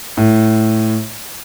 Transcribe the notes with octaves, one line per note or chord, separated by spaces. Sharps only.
A2